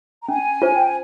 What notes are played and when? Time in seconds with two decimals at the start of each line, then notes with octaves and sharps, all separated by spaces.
0.23 A#5
0.28 C#4 G#5
0.62 F4 C5
0.74 G5
0.85 G#5